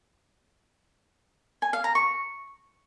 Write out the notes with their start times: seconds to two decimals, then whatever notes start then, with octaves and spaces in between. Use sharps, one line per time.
1.62 G#5
1.73 F5
1.84 A#5
1.95 C#6